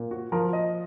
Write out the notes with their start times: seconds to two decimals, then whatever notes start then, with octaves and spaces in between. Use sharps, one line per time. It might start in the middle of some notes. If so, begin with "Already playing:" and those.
Already playing: A#2
0.11 F#4
0.32 F3 A#4
0.53 D#5